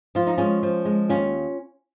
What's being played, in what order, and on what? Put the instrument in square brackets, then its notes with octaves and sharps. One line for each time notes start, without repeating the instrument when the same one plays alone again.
[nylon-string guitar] F3 F4
D#4
G#3 C#4 F4
F3
G#3
D#2 C#4 F4